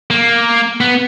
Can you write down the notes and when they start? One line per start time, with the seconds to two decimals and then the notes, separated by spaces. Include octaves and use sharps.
0.11 A#3
0.81 B3